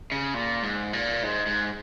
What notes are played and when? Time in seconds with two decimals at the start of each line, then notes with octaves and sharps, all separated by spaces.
0.12 C#3
0.34 A#2
0.63 G#2
0.93 A#2
1.23 G#2
1.46 G#2